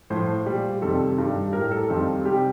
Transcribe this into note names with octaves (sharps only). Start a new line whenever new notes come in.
A2 F3 C5
A#2 G3
F2 C3 D#3 G3 A4
G2 D#3 G3
A2 G3 A#4
A4
F2 D#3 G3
C3 G3 G4